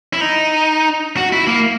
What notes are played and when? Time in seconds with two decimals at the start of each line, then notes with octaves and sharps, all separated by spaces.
0.13 E4
0.21 D#4
1.17 F#4
1.32 E4
1.47 A#3